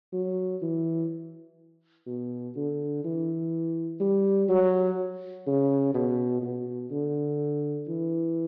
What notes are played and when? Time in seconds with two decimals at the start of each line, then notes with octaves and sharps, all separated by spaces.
0.13 F#3
0.62 E3
2.07 B2
2.56 D3
3.04 E3
4.00 G3
4.49 F#3
5.47 C#3
5.94 B2
6.42 B2
6.91 D3
7.88 E3